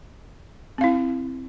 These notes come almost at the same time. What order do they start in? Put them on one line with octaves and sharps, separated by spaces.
C4 F5 E4